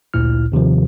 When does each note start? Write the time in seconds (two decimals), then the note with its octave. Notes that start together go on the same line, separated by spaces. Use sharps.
0.14 A1 D2 A#2 E4 F6
0.52 D#2 C3 D#3 F3